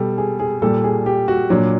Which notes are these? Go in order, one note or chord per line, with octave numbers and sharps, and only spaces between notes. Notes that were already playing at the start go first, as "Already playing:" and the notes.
Already playing: B2 G3 A4
G#4
G#4
A#2 G3 A4
G#4
G4
F#4
A#2 F#3 D4